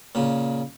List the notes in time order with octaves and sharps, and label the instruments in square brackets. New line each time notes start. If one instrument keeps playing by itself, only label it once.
[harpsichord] A#2 C#3